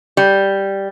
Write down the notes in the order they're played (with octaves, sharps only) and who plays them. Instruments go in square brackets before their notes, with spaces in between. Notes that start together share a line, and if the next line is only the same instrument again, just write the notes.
[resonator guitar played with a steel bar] G3